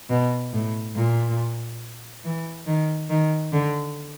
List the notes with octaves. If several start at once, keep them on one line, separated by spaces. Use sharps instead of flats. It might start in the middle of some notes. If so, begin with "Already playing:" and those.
B2
A2
A#2
E3
D#3
D#3
D3